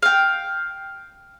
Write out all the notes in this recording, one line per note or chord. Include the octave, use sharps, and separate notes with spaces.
F5 G5